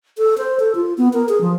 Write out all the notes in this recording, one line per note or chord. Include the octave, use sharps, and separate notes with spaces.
A4
C5
A4
F4
B3
A#4
G#4
F3